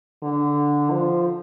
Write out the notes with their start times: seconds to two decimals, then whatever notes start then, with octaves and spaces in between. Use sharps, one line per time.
0.23 D3
0.91 F3